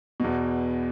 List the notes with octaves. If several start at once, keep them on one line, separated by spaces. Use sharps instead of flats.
E2 B2